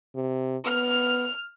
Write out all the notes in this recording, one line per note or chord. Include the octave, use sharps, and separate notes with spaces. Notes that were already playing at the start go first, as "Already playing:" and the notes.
C3
B3 F6